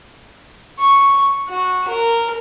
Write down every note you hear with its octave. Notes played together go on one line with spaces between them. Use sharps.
C#6
F#4
A#4